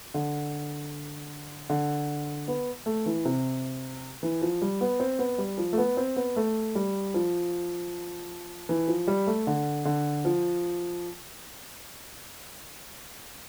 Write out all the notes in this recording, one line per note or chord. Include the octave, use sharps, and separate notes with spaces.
D3
D3
B3
A3
E3
C3
E3
F3
G3
B3
C4
B3
G3
F3
A3
B3
C4
B3
A3
G3
F3
E3
F3
G3
A3
D3
D3
F3